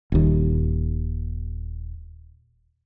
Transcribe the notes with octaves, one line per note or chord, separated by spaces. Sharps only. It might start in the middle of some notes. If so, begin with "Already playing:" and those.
D#1 D#2